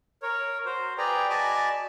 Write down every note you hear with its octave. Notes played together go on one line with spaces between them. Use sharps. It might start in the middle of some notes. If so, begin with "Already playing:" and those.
A#4 C#5
F#4 C5
G#4 B4 D5 G5 A#5
F#4 D5 D#5 G#5 A5 B5